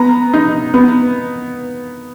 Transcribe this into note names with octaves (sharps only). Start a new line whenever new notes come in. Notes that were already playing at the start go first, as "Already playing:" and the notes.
Already playing: B3 A#5
D#4
B3